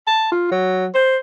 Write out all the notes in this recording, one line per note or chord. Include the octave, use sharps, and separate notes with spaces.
A5
F4
F#3
C5